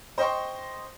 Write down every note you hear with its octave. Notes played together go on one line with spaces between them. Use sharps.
C5 D#5 G5 C6 C#6